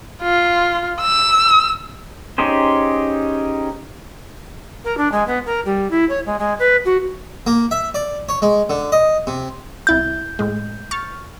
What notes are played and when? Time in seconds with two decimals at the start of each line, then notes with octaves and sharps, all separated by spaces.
0.23 F4
1.01 E6
2.38 C#4 D#4 G4 G#4 C5
4.85 A#4
4.97 D4
5.12 G#3
5.27 B3
5.46 A#4
5.65 G3
5.90 E4
6.09 C#5
6.26 G#3
6.39 G#3
6.59 B4
6.85 F#4
7.47 A#3
7.71 E5
7.94 D5
8.29 C#5
8.42 G#3
8.70 D3
8.92 D#5
9.27 C3
9.87 C2 E4 G6 A6
10.39 A2 G#3
10.91 C#6 F6 A6